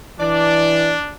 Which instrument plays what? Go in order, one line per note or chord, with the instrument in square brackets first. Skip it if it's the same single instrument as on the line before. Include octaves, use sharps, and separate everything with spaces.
[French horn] E3 [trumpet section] D4 [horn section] D5